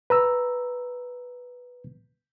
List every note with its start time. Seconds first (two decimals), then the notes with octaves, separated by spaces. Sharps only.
0.10 B4 A#5 E6